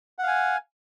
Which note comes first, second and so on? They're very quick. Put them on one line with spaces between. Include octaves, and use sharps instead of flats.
F#5 F5 G#5